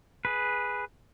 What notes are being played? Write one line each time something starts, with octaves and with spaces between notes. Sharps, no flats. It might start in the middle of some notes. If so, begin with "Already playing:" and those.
G#4 B4